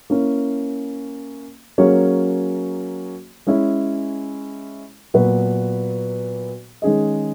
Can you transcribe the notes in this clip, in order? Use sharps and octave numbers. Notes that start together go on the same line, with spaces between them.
A#3 C#4 E4
F#3 A#3 C#4 G#4 C#5
G#3 C#4 E4 G#4 C#5
A#2 F#3 B3 F#4 B4
D#3 G#3 C#4 G#4 D#5